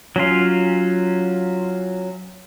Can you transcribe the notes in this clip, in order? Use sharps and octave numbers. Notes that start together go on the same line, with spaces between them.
F#3 C#4 F4